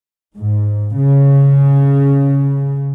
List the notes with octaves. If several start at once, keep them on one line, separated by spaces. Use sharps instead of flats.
G#2
C#3